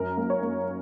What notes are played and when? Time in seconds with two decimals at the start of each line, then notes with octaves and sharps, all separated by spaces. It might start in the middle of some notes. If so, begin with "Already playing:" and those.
Already playing: F#2 A#4
0.17 A#3
0.30 C#5
0.42 A#3